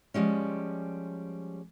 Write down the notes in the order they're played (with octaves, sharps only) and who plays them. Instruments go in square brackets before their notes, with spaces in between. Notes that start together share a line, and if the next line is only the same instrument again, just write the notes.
[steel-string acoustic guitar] F3 G3 G#3 C#4